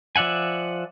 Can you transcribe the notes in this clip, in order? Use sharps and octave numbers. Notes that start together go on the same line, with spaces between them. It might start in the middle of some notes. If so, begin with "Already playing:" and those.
F3 D5 E5 F#5 G#5